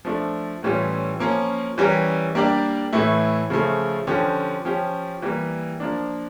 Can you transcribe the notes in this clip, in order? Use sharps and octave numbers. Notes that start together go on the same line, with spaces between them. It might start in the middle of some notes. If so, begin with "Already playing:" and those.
F3 A3 D4
A2 E3 G3 C#4 F4
F3 A#3 C#4
E3 G3 C#4 G4 A#4
G3 A#3 D4 G4 D5
A2 E3 A3 E4
C#3 F3 A3
D3 F3 C#4 G4
F3 C#4 G4
E3 G3 A#3
F3 A#3 D4